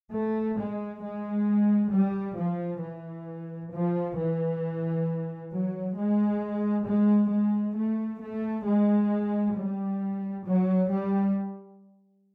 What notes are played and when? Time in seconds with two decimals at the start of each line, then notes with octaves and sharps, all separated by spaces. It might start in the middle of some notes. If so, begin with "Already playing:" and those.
0.12 A3
0.57 G#3
1.02 G#3
1.91 G3
2.37 F3
2.81 E3
3.71 F3
4.17 E3
5.52 F#3
5.96 G#3
6.86 G#3
7.31 G#3
7.76 A3
8.21 A3
8.66 G#3
9.56 G3
10.46 F#3
10.91 G3